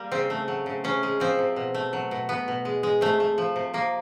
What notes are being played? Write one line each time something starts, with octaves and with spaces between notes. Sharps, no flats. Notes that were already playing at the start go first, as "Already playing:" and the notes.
Already playing: G3 A#3
C#3 C4
A3
F#3
C#3
C3 C#4
G#3
F3 C4
C3
B2
A3
F#3
B2
B2 B3
B2
G#3
G#3
C3 A3
A3
F3
C3
C3 A#3